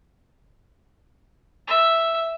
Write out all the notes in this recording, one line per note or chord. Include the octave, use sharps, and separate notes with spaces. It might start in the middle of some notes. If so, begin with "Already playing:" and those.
E5